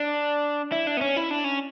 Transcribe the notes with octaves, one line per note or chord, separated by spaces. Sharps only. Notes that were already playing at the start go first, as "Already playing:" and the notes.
Already playing: D4
E4
D4
B3
C#4
E4
D4
C#4